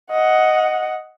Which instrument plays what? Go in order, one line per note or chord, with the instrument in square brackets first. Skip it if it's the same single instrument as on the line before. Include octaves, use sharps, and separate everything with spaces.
[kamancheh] D#5 F#5